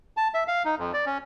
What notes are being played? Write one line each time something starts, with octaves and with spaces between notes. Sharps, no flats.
A5
E5
F5
D#4
F2
D5
C#4